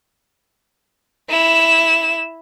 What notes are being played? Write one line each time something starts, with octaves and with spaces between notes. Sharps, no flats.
E4 E7